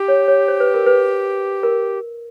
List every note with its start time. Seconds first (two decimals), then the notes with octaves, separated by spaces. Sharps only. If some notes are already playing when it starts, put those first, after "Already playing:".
Already playing: G4
0.08 C#5
0.28 C#5
0.48 C5
0.60 B4
0.74 A#4
0.86 B4
1.63 A#4